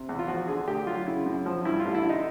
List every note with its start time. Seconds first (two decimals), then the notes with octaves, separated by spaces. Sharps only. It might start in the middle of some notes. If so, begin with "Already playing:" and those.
Already playing: C3
0.09 E2
0.19 F4
0.28 F3 F#4
0.48 D3 G#4
0.67 D2 G4
0.87 F#3 F4
1.06 C#3 E4
1.26 F#2
1.46 F3
1.65 G2 E4
1.80 F4
1.85 A1
1.95 E4
2.04 D3 D#4